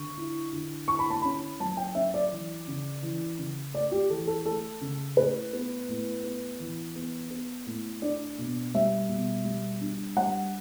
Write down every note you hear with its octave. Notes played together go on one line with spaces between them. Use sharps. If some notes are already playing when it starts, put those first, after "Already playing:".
Already playing: D3 C#6
E4
D3
E4 C#6
B5
A5
C#4 B5
F#3 A5
G5
C#4 E5
D5
E3
C#3
E3
C#3
A3 D5
G4
E3 A4
A4
A3 A4
C#3
A2 B4
B3
A2
B3
E3
B3
B3
A2
D4 D5
B2
G3 E5
B2
G3
D4
G3 F#5